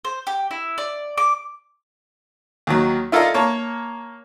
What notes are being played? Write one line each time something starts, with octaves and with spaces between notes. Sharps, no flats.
C5
G4
E4
D5
D6
D#2 D#3 F#3
E4 F4 A4 A#4 D5 D#5
A#3 C#5 A5